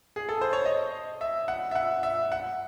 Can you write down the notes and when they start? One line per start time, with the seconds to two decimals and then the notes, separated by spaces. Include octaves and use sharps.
0.16 G#4
0.29 A4
0.41 C5
0.53 C#5
0.66 D#5
1.21 E5
1.48 F#5
1.71 E5
1.75 F#5
2.03 E5
2.32 F#5